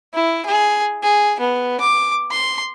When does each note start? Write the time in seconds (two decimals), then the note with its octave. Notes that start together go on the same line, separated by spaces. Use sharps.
0.14 E4
0.46 G#4
1.03 G#4
1.40 B3
1.81 D6
2.31 C6